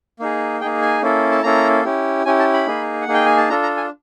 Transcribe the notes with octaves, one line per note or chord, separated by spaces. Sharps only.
A#3 D#4 G#4
A#3 D#4 G#4 G5
G#5
A#3 C#4 E4 A4
A5
A#3 C#4 E4 A4 A#5
C#4 E4 G4
C#4 E4 G4 G#5
A5
B5
A#3 D#4 G#4
F#5
A#3 D#4 G#4
G5
G#5
A5
D4 F4 A4 A#5
A#5
G#5